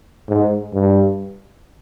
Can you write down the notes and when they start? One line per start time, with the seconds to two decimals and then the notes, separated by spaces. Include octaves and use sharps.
0.29 G#2
0.74 G2